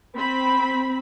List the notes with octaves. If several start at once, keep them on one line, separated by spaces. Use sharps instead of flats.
C4 B5